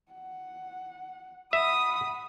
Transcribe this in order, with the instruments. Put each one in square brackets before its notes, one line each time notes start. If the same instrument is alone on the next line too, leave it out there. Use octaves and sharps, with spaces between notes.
[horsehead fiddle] F#5
[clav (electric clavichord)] E5 [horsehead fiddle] F#5 B5 [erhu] D#6